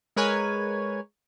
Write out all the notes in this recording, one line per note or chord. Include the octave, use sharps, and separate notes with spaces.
G#3 A#4 B4 C#5 G#5